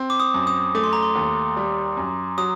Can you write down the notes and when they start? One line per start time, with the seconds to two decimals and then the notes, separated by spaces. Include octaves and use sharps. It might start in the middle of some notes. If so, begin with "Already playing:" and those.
Already playing: C4
0.10 D6
0.20 D#6
0.34 F#2
0.47 D#6
0.75 A3 D6
0.84 C6
0.93 A#5
1.03 C6
1.15 D#2
1.56 G3
1.97 F#2
2.38 F#3 D#6